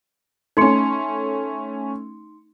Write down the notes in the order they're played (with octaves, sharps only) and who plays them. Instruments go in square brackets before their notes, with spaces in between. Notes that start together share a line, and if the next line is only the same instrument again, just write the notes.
[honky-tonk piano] A3 C#4 [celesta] D#4 C6 C#7